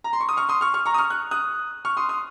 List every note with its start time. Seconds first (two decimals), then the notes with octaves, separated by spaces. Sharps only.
0.04 A#5
0.13 C6
0.21 C#6
0.29 D#6
0.37 C#6 F6
0.49 C6 D#6
0.61 C#6 F6
0.74 C#6 F6
0.86 A#5 C#6
0.94 D#6
0.98 C#6 F6
1.10 F#6
1.31 D#6 F#6
1.85 C#6 F6
1.97 C6 D#6
2.09 C6 D#6